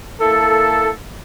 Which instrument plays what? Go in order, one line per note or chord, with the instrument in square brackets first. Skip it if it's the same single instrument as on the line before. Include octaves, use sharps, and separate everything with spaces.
[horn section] A#3 E4 A4